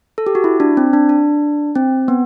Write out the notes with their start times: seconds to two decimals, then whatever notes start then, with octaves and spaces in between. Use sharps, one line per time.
0.18 A4
0.27 G4
0.35 F#4
0.44 E4
0.60 D4
0.77 C4
0.93 D4
1.09 D4
1.75 C4
2.08 B3